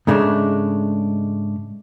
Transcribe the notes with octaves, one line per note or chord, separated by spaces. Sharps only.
G#2 C#3 G#3 A3 B3 D4